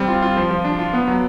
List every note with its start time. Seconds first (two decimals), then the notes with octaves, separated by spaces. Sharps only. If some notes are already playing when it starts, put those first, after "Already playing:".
Already playing: G3 C4
0.08 F4
0.22 F4
0.37 F3
0.51 F3
0.64 D4
0.79 F4
0.93 B3
1.08 F#3